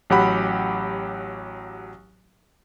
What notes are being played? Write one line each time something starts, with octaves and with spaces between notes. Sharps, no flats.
A1 F#3 G4 F#5 B5